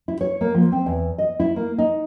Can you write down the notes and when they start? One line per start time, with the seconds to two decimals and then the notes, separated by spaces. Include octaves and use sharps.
0.08 E4
0.21 C#5
0.41 A#3
0.54 F3
0.72 C4
0.86 E2
1.18 D#5
1.40 E4
1.56 A#3
1.78 D#4